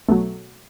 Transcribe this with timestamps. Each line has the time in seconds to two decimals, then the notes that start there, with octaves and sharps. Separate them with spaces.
0.09 B1 B2 F#3 A3